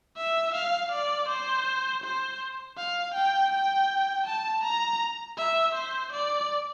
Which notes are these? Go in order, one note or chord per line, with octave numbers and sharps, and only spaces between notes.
E5
F5
D5
C5
C5
F5
G5
G5
A5
A#5
E5
C5
D5